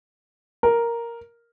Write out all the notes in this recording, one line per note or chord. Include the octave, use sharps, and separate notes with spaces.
A#4